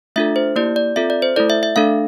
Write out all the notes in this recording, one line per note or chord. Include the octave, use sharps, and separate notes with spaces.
A3 D4 F4 A4 E5
C5
A#3 E4 G4 D5
D5
C4 F4 A4 E5
D5
C5
A3 E4 A4 D5
E5
E5
A3 D4 A4 F5